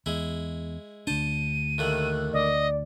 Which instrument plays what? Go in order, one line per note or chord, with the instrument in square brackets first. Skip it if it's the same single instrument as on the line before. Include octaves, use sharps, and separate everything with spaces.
[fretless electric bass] E2 [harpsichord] G#3 E4
[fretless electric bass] D2 D4 [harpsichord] C5 A5 [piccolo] D#7
[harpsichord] D#2 A2 D#3 [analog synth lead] F#6
[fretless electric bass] D2 [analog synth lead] D5 [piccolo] D#5